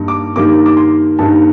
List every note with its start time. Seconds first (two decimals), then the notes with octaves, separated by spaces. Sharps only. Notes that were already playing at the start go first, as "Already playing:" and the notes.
Already playing: G2 D#3 G3 A#3 D#4
0.08 D6
0.36 G2 D#3 G3 A#3 D#4 D6
0.66 D6
0.77 C6
1.19 G2 D#3 G3 A#3 D#4 A5